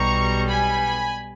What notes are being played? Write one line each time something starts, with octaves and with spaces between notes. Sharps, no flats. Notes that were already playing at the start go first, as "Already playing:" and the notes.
Already playing: B1 B2 G3 A#5 C#6
G#5 B5